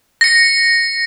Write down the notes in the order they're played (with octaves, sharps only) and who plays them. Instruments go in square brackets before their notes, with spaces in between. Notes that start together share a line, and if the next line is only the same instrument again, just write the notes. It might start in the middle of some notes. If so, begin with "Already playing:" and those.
[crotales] A#6 C#7